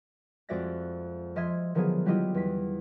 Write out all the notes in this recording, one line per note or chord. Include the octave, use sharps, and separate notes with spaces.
F2 G#3 F#4 D5 E5 A#6
F3 D#5 E5 C6 G#6
D3 D#3 F3 F#3 B3 G#4
F#3 G3 E4 F4 G4 D#5
E2 B6